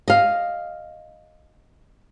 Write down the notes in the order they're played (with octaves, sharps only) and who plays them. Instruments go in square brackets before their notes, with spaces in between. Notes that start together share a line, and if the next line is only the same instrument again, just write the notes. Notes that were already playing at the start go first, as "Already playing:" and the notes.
[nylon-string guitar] D#5 F5